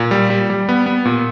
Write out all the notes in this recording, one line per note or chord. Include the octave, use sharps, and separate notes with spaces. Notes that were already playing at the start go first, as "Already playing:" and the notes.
Already playing: A#2
G3
G3
G3
B3
B3
A#2